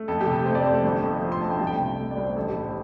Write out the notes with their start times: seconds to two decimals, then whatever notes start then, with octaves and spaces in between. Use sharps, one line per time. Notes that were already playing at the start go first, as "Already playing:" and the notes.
Already playing: A3
0.08 F2 A4
0.21 G4
0.27 C3
0.33 A4
0.45 A3 C5
0.55 D5
0.65 F2 C5
0.74 A4
0.84 G1
1.03 F2
1.22 F3 C5
1.32 C6
1.41 A3 A5
1.50 G5
1.59 C2 A5
1.67 G5
1.80 C3
1.99 A3
2.11 D5
2.17 C2
2.23 C5
2.36 A1 A4
2.49 G4
2.56 A2
2.62 C5